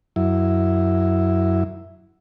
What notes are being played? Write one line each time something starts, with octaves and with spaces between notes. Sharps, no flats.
F#2 E4